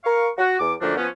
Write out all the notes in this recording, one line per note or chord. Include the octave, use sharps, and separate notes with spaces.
A#4 F5 C#6
F#4
E2 D6
F#2 D3 F3 A3 A#3 D4
F3 B3 C#4